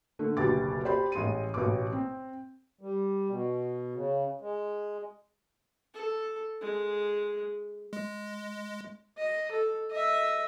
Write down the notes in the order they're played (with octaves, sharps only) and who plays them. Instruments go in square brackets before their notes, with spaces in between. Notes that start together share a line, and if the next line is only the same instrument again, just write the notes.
[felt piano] D3 A3
F#1 D2 B2 G4 D6 A6
G4 C5 D5 B5
A1 G#3 C6 D#7
A1 B2 D6
C4
[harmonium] G3
B2
C#3
G#3
[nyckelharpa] A4
G#3
[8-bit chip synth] G#3
[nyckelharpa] D#5
A4
D#5 E5